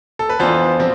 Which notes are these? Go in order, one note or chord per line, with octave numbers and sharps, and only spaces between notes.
A4
B4
F2 E3 B3 D4 F4 C5
F3 C4